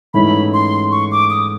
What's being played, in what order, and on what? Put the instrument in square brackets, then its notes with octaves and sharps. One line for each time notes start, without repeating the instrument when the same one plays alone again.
[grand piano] G#2 E3 A3 C#4 E4 [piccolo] B5
[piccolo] C6
C#6
D6
D#6